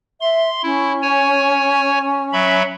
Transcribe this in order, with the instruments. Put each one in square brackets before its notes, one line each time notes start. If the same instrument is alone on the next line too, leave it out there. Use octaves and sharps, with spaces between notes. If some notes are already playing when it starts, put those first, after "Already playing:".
[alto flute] E5 [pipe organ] C6
[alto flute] C#4 [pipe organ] E4
[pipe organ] C#5 G#5
F#3 E5 B5